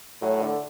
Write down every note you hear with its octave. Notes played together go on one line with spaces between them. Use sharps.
A2 F#3
D3